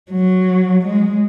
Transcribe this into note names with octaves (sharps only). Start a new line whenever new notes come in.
F#3
G#3